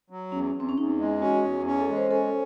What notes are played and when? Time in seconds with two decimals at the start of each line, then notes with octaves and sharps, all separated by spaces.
0.10 F#3
0.32 E2 C#4
0.55 E2 C4
0.69 C#4
0.78 E2 D#4
0.99 G#3
1.21 C#4 F#4
1.44 E2
1.66 C#4
1.80 A4
1.88 G#3
1.96 C5
2.11 C#4 A4